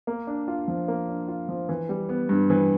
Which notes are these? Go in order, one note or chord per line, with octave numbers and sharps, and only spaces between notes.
A#3
D4
F4
F3
A#3
D4
F4
F3
E3
G3
B3
G2
E3